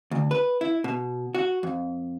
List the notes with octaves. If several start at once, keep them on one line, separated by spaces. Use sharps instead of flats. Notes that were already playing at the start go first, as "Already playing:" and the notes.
D2
B4
E4
B2
F#4
F2